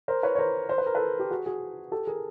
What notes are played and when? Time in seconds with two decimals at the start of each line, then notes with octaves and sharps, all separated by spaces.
0.08 A#4 C5
0.23 B4 C#5
0.35 C#5
0.38 A#4 C5
0.69 C5
0.78 B4
0.86 A#4
0.95 A4 B4
1.19 G4
1.31 F#4 G#4
1.46 F#4 G#4
1.92 G4 A4
2.07 G#4 A#4